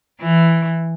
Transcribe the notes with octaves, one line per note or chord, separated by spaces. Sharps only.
E3